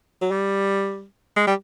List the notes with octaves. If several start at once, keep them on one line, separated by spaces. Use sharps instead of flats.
F#3
G3
G#3
G3